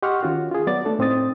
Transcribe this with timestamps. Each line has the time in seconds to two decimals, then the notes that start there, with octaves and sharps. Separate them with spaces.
0.03 G4 D#5 F#5 C6 C#6 F6
0.23 D#3 C#4 F4 F#4
0.51 F4 G#4
0.67 F#3 B3 D5 A6
0.85 A3 D4 A4
0.99 A2 C4 D#4 D#6 A6